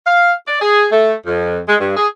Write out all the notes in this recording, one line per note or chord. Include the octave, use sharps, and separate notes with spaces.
F5
D5
G#4
A3
F2
G#3
G2
G#4